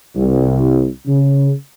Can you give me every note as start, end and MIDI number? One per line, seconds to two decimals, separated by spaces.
0.15 0.86 36
1.06 1.50 49